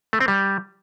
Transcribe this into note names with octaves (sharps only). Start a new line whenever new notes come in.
A3
C4
G3